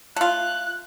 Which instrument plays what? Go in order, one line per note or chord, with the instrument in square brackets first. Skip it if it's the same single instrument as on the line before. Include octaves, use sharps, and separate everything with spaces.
[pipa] A3 F4 [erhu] F#6